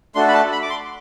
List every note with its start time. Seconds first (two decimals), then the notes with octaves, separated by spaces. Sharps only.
0.15 A3 D4 F#4 A4 C6
0.28 B5
0.34 A5
0.52 B5
0.62 D6
0.70 C6